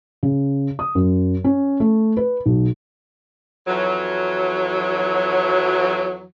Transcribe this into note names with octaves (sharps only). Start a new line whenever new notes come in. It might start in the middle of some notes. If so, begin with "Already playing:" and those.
C#3
D#6
F#2
C#4
A3
B4
B1
F2 E3 F#3